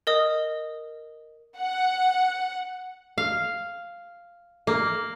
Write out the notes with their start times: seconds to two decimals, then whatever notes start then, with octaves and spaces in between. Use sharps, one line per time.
0.07 A#4 D#5 D#6
1.57 F#5
3.18 F5
4.67 A#3